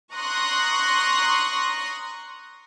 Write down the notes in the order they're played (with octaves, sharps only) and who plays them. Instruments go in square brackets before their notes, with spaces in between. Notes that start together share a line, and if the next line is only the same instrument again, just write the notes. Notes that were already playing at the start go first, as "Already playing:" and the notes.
[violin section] A#5 C6 C#6 D#6 F#6